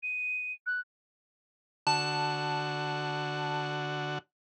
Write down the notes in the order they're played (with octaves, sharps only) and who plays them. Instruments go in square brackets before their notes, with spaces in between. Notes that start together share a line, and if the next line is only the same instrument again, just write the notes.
[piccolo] D#7
F#6
[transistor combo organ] D3 F#4 [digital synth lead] A5